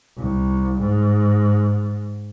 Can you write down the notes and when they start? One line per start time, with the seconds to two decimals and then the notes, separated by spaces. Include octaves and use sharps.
0.18 C2
0.81 G#2